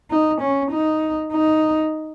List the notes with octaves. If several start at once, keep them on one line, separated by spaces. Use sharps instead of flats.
D#4
C#4
D#4
D#4